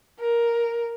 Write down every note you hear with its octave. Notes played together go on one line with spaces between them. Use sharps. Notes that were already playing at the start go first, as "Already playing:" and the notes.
A#4